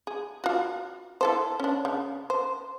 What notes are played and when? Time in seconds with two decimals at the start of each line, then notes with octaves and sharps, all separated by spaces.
0.07 G#4
0.44 F4 F#4
1.21 E4 A4 C5
1.60 C#4 D4
1.85 C#3
2.30 C5